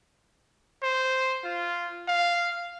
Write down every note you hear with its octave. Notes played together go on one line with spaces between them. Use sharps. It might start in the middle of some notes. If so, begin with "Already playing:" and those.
C5
F4
F5